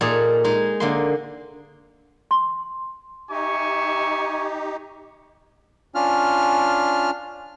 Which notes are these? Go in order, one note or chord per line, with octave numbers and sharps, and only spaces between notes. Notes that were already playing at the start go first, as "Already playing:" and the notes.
A#2 D#4 G#4 A4
G#3 D#4 G#4
D3 A#3 C6
C6
D#4 G4 E5 G#5 C#6
C#4 D4 F4 F6